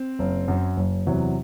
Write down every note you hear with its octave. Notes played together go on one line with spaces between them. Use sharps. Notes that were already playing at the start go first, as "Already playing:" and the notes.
Already playing: C4
F#1
F#2 F#3
F#1
E2 C3 F#3